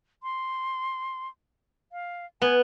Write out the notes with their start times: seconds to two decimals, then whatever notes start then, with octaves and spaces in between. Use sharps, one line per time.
0.23 C6
1.92 F5
2.42 B3 G#5